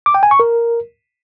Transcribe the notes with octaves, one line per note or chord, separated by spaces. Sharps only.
D6
G5
G#5
C#6
A#4